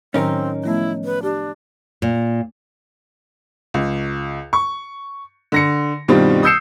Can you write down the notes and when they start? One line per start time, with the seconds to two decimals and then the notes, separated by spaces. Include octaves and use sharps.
0.14 A2 D#3 F#3 C4 C#4 D#4 A#4
0.64 F3 A3 B3 E4
1.05 B4
1.23 D4 G4
2.02 A#2
3.74 C#2
4.53 C#6
5.52 D3 A#6 C#7
6.08 G2 B2 D#3 G3 C4 F4
6.43 D#6 E6 G6 C7 C#7 E7